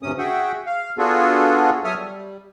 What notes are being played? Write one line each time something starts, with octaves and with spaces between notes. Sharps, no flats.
D2 G2 C3 C#4 D#6
F#4 G#4 E5 F#5 G5
F5
B3 D4 F4 F#4 G#4 A4
F#3 A4 C#5 E5 D#6 F6
G3